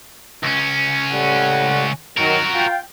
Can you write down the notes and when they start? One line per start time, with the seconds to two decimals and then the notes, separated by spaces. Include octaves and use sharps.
0.43 C#2 C#4
1.11 A2 G3 F#5
2.17 D#3 F#3 F#4 A#4
2.53 F4 G5